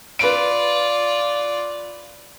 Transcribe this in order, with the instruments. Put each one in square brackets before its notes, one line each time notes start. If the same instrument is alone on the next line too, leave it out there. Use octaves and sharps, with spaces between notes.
[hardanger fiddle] F4 D5 [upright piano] B4 D7